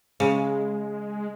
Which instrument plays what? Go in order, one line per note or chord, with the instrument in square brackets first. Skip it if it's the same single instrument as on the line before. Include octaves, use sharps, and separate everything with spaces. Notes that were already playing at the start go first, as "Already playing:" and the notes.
[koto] C#3 [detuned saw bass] G#3